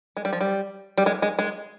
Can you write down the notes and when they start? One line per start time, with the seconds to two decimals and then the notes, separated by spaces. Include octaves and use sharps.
0.17 G#3
0.25 G3
0.33 F3
0.41 G3
0.98 G3
1.06 G#3
1.22 G#3
1.39 G#3